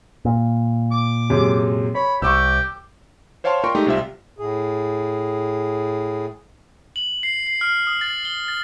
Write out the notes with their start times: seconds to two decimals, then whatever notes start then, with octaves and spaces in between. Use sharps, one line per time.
0.25 A#2
0.92 D6
1.30 F#2 C3 G#3
1.95 C#5 B5
2.22 C2 G4 C#6 D6 E6
3.44 C5 C#5 F5 G5 A5 C6
3.64 F4 A#4 D5 G5 C6 C#6
3.75 G#3 A3 D#4 G4
3.86 C2 C3 F4 E5
4.38 A2 G#4
6.96 F#7
7.23 C7
7.47 C7
7.61 F6
7.87 D#6
8.01 A6
8.25 G7
8.48 A6